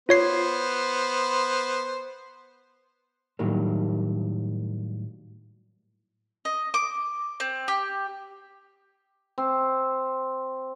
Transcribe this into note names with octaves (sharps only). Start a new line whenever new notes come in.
B3 F4 C5 C#5 C7
A2 D#3 F#3 G3 A#3
D#5
D6
C4
G4
C4